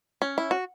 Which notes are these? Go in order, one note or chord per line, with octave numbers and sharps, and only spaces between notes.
C#4
E4
F#4